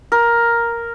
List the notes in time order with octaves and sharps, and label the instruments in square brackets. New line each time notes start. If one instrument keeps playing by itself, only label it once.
[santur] A#4